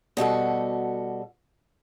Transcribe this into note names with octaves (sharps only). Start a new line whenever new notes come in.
B2 G3 F#4 A4